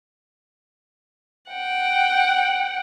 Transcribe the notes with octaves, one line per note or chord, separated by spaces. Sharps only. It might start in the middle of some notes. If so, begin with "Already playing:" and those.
F#5 G5